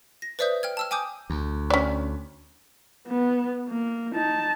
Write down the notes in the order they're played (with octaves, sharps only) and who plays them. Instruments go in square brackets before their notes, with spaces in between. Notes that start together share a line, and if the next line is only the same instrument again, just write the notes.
[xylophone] A#6
B4 C5 D5 E5 D#6 G6
G5 F6 G#6
A5 E6 F6
G5 G#5 D6 D#6 G6
[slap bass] D2
[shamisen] C#4 D5
[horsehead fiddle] B3
A#3
D#4 A5